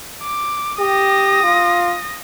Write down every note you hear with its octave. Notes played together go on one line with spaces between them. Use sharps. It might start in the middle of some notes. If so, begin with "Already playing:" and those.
D6
G4 D#6 A#6
F4